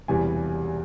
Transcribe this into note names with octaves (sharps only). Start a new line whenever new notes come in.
E1 E2 C3 E3 G3 G#5